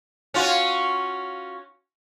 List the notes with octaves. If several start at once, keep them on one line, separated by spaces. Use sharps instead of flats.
C#4 F4 F#4